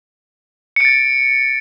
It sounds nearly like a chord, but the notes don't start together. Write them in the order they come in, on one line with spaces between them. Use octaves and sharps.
C#7 D7 A6